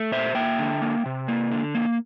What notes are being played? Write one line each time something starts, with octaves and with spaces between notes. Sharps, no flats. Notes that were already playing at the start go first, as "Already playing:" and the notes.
Already playing: A3
A#2 C5 E5
A#3 E5 G5
D3
A#3
C3
A#3
D3
A#3